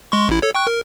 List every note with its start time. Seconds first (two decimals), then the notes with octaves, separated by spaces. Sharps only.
0.12 G#3 C6 C#6
0.29 A1 E4
0.42 A4 C#5
0.55 G5 C#6 F#6
0.67 A#4